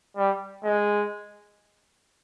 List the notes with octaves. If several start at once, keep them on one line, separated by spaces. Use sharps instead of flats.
G3
G#3